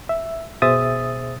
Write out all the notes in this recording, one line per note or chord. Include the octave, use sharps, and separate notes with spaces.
E5
B2 G#4 C5 E5 D#6 A6